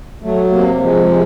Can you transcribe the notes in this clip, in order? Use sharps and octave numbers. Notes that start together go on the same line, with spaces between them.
F#3 A3
C3 A#3
F3 G#3
G#3